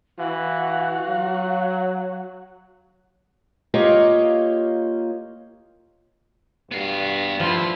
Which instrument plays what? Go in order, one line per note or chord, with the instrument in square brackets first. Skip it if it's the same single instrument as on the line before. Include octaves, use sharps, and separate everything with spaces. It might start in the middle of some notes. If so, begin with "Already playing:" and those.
[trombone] E3 [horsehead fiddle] F#4 [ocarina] F5
[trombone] F#3
[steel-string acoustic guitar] A#3 F4 G4 C#5 D#5
[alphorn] G2 [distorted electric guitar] B3 F5 [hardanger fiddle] F#4
[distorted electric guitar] A2 [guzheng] F3 [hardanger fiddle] E4 C6